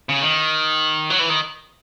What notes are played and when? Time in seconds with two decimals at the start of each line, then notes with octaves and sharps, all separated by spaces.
0.09 C#3
0.21 D#3
1.10 F#3
1.19 E3
1.29 D#3